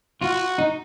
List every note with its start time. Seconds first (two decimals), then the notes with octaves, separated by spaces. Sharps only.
0.21 F4 F#4
0.58 D#4